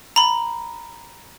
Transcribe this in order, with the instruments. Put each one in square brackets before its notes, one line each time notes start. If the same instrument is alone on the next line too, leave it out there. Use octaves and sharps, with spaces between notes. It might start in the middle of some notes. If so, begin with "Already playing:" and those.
[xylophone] A#5 B5